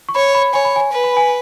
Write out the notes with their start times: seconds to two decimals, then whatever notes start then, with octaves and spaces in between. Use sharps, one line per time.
0.09 C#6
0.15 C#5 B5
0.35 B5
0.53 C#5 G#5
0.65 B5
0.76 G#5
0.92 B4
1.04 B5
1.17 G#5